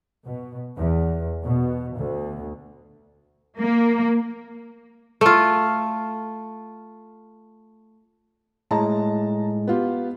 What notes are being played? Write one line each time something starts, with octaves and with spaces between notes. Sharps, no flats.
B2
E2
B2
D2
A#3
A3 F4
A2 G#3 A5 A#5
B3 F4 G4